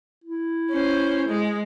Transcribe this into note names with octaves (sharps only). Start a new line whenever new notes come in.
E4
C#4 C5
G#3